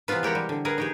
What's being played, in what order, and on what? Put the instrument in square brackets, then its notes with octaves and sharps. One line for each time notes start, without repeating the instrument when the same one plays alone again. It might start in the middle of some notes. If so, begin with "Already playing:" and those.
[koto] C3 E3 B3 F4 B4
G#3 G4 A#4 F#5
G3
D3
G#4 A#4 B4
D#4 G4 G#4